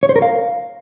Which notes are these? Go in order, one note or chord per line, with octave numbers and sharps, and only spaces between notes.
C#5
C5
A#4
F5